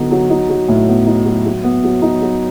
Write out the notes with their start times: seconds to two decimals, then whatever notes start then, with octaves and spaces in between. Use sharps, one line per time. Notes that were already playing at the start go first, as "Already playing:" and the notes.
Already playing: D3 F#3 B3 D#4
0.11 F#3
0.30 D#4
0.49 F#3
0.68 A2
0.88 B3
1.07 D#4
1.25 F#3
1.45 F#3
1.64 B3
1.84 F#3
2.02 D#4
2.22 F#3